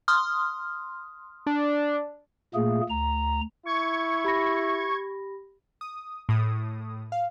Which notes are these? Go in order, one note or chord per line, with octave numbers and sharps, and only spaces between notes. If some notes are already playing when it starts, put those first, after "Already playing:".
C6 D#6 F6
D4
A#2 A3 A#3 G#4
D2 A#5
E4 C#6 G#6
G4 B5 A#6
D#6
A2 D#6
F5